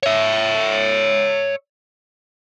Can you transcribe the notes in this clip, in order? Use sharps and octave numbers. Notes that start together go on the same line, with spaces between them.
C#5 E5